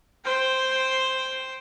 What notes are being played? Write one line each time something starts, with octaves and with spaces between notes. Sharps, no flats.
C5 G5